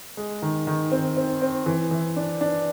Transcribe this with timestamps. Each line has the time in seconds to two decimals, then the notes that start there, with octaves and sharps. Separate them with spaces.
0.17 G#3
0.42 D#3
0.67 D#3
0.91 C4
1.17 C4
1.42 C4
1.66 E3
1.91 E3
2.16 D4
2.41 D4